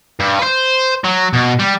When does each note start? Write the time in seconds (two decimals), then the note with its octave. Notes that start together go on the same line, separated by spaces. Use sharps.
0.20 G2
0.39 B4 C5
1.04 F#3
1.33 B2
1.59 G3